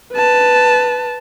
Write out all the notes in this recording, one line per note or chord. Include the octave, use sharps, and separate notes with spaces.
B4 A5